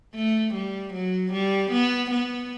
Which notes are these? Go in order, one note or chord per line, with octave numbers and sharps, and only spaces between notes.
A3
G3
F#3
G3
B3
B3